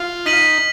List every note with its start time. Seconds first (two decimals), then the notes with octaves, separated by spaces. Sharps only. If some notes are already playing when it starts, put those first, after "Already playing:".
Already playing: F4
0.26 D#4 F6 B6 D#7 F#7